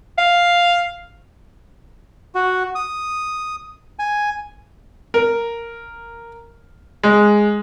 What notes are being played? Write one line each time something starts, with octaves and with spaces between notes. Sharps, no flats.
F5
F#4
D#6
G#5
A#4
G#3